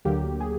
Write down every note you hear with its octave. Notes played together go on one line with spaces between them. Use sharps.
D2 D3 F#3 A#3 G4
G#4